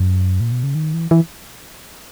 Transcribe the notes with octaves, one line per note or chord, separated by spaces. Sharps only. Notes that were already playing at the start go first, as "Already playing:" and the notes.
Already playing: F#2
A#2
B2
C#3
D#3
E3
E3